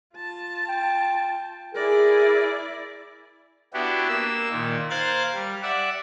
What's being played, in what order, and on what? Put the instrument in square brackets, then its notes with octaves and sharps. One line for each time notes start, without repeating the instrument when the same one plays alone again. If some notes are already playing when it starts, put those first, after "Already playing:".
[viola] F4 A5
[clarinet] G5
[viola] E4 D5 [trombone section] G#4 [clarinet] A#4
[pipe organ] B3 D4 E4 F#4 G4
A#3 E6
A#2 D#3
A#4 C5 F5 F#6 G#6 A6
G3
D5 E5 F#5